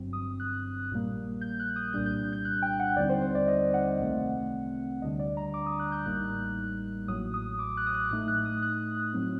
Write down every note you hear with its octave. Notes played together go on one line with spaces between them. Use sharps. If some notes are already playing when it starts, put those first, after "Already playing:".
Already playing: G1 G2 F#3 C4
D#6
F#6
A#1 A#2 G3 A#3
G6
F#6
D#6
C2 A#2 G3 D4 G6
G6
G6
F#6
G5
F#5
D#2 D3 G3 C4 D#4 D5
C5
C5
D5
D#5
F#5
C2 C3 D#3 A3 C4
D2 D3 G3 D4 D#5
D5
A#5
D6
D#6
F#6
G6
A1 A2 G3 A#3 D#4 F#6
A1 A2 F#3 D#6
D#6
D6
F#6
D#6
F#6
A2 A3 D#4 F#6
F#6
D#6
F#6
A2 F#3 C4